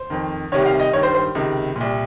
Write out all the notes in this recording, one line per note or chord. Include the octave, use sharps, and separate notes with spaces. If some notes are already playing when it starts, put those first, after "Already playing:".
Already playing: C5
F2 D#3
C2 C3 D#3 C#5
F5
D#5
G2 D#3 C#5
C5
C5
C#2 C3 D#3
C2 A#2